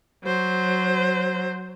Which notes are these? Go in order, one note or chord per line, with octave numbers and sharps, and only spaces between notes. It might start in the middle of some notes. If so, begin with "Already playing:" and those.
F#3 C5